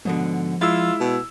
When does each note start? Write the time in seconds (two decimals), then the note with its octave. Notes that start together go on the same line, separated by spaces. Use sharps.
0.05 G#2 B2 D3 F3
0.61 G#3 E4 F4 E6
1.00 B2